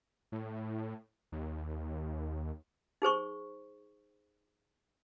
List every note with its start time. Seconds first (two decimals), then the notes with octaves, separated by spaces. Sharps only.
0.32 A2
1.32 D#2
3.02 D#4 G#4 C5 C#6